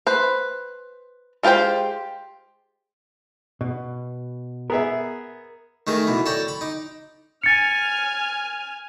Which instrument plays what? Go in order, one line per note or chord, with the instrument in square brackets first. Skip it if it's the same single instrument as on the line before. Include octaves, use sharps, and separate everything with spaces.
[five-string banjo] B4 C5
G#3 F4 G4 C5 G5
[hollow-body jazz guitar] B2
[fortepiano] B3 G#4 E5 [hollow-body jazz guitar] A#4
[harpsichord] D#3 A3 G#4 A#4
B2 E3
A4 C#5 D5 G5 A#5
B5
D#4 D6
[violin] G#5 F6 [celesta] A6 C#7